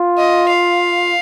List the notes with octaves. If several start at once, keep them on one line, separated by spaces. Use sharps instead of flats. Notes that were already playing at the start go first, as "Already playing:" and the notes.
Already playing: F4
D#5
F5